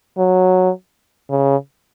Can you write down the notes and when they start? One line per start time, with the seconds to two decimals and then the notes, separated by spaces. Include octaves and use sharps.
0.18 F#3
1.30 C#3